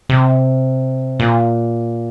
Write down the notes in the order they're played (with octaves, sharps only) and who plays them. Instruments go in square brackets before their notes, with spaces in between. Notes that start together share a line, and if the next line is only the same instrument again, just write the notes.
[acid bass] C3
A#2